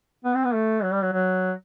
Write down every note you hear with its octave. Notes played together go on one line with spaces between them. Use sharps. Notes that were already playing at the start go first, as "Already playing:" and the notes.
B3
C4
B3
A3
F#3
G3
F#3
F#3